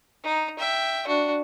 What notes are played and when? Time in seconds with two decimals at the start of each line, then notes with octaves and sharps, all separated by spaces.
0.24 D#4
0.59 E5 G5
1.08 D4 F#4